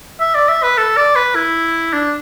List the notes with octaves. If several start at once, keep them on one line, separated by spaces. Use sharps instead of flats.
E5
D5
E5
B4
A4
D5
B4
E4
D4